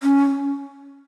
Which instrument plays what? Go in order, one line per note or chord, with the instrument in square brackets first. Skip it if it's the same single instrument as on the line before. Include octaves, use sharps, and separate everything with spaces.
[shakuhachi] C#4